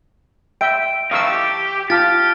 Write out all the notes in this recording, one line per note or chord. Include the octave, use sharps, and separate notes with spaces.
E5 G5 D7
E3 A3 D#4 F5 C#6 E6
G4
F4 G4 A5 F6 A6